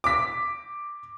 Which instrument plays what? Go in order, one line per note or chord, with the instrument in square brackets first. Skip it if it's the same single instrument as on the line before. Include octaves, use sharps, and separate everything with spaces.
[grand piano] D6 B6